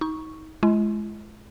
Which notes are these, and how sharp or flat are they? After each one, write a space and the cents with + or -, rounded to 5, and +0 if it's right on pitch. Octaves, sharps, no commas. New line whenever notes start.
D#4 +25 C#6 +0
G#3 +30 E4 +45